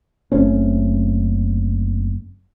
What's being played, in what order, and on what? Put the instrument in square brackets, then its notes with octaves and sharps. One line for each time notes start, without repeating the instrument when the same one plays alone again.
[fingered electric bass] F#1 A3 C4 C#4